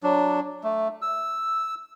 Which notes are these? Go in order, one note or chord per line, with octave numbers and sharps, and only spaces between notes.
F#3 D4
A3
E6